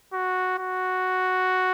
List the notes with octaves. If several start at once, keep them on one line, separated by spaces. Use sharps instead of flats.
F#4
F#4